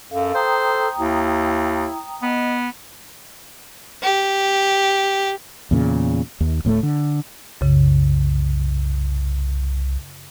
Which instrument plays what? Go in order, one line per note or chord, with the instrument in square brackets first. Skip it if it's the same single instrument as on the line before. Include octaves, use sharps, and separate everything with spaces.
[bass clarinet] F#2 [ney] A4 [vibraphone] F5
[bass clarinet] C5 [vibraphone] G5 A#5 D#6
[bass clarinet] D#2 [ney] E4
[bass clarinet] B3 [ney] D#5
[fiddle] G4
[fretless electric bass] E2 A#2 C#3
D#2
D1 A2 G3 A3
D3
[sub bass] C2 [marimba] F#2 C#3